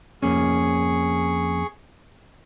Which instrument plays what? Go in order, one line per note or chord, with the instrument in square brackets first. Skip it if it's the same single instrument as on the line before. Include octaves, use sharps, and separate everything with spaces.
[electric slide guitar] F2 A#3 C#4 [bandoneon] G#4 C#6